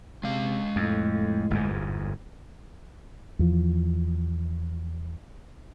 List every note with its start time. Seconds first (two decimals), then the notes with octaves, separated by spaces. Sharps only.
0.24 C3 G#3 F5
0.76 F2 A2
1.51 G1 E2 G#2
3.39 E2 F3